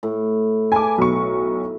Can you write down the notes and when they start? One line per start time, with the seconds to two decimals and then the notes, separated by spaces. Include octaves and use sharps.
0.03 A2
0.72 B4 G#5 A5 D6
0.98 B1 C#6